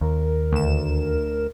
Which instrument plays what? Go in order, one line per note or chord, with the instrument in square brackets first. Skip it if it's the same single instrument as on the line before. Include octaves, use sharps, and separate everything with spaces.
[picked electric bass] D#2 [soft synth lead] A#4
[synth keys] D2 E7